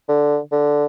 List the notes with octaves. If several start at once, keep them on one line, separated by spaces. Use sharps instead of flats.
D3
D3